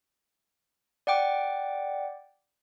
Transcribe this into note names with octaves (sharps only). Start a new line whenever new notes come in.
D5 F#5 G5 D6